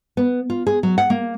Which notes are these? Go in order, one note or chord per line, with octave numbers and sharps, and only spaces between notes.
B3
F4
G#4
F#3
F#5
A#3